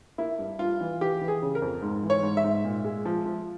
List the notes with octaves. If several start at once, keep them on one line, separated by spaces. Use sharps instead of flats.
A#3 E4
G2
G2 F4
E3
E3 G4
E3
G#4
C#3
A#4
F2
G#2
E3
C#5
G#2
E5
G#2
A#2
G#3
F3
F3